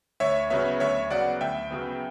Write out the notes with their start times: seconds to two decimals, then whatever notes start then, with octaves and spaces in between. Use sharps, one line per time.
0.20 D2 C#5 E5
0.50 C#3 F#3 B3 C#5 E5
0.80 D2 C#5 E5
1.11 C#3 F#3 B3 D5 F#5
1.41 D2 E5 G5
1.71 C#3 F#3 B3